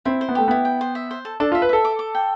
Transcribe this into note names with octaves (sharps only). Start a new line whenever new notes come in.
C4 E4
C5
B3
A3 G4
B3 E4
G5
C5
E5
C5
A4
D4 A4
F4
E5
B4
A4 E5
D6
D6
G5